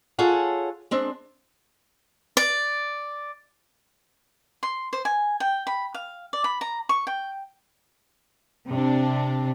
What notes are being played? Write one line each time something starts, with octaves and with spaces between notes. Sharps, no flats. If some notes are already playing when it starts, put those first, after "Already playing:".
F4 G#4 A4 C#5 F#5
G#3 C4 D4
D5
C6
C5
G#5
G5
B5
F5
D5
B5
A#5
C#6
G5
C3 D4